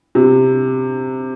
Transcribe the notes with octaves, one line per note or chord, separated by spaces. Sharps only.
C3